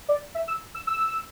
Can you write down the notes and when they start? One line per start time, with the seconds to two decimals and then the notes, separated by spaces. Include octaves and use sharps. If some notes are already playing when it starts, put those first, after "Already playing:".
0.09 D5
0.35 E5
0.48 E6
0.75 E6
0.87 E6